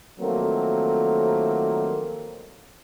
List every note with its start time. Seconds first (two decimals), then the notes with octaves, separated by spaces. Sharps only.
0.20 D#3 F3 F#3 A3 A#3 C4